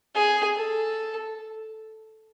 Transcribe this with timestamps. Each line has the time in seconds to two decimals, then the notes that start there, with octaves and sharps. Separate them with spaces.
0.15 G#4
0.56 A4